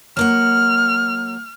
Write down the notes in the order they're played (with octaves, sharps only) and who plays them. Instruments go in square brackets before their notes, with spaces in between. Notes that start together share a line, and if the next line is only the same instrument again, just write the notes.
[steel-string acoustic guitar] F#3 A#3 F#5 [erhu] F6